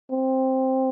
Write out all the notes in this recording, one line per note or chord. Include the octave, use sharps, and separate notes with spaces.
C4